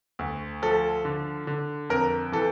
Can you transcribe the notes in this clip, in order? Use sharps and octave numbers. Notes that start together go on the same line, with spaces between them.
D2
F3 A4
D3
D3
F2 A#4
E3 A4